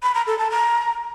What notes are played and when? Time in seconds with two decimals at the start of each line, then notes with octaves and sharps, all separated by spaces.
0.03 B5
0.15 A#5
0.27 A4
0.39 A5
0.51 A#5